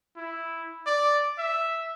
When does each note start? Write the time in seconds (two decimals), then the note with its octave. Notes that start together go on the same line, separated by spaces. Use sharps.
0.17 E4
0.86 D5
1.39 E5